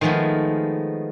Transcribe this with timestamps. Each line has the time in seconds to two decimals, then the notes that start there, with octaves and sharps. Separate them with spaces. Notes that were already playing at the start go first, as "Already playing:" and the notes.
0.01 D#3 F3 G#3 A3 B3